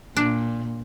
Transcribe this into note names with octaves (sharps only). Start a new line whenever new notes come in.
A#2 D4